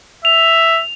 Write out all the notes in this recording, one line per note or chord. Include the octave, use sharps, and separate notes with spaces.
E5 F7